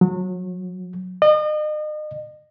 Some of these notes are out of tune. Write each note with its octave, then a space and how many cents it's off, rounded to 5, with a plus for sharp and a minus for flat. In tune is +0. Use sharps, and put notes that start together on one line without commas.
F#3 -30
D#5 -35